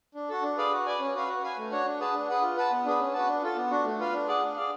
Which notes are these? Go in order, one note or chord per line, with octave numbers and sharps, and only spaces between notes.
D4
F#4 A4
D4
G#4 B4 D5 F5
F#4
B4 D5 G#5
C#4
F#4 B4 F5
F#4
B4 F5 G#5
A3
D4 F#4 C#5 F#5
D4
G#4 B4 F#5 A5
D4
G#4 B4 F#5
F4
B4 F#5 A5
B3
D4 G#4 B4
C#4
F#4 B4 F#5 A5
D4
F4 A4
B3
D4 F#4
A3
F4 B4 F5
D4
G#4 D5 F#5
D4
G#4 D5 F5